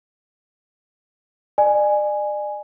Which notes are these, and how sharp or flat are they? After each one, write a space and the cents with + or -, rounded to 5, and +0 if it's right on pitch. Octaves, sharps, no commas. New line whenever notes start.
D5 +40 G#5 +0